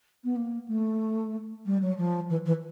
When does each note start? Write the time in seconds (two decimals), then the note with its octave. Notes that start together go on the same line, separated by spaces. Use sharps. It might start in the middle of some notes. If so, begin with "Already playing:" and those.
0.24 B3
0.36 A#3
0.68 A3
1.66 G3
1.82 F#3
1.98 F3
2.30 E3
2.46 E3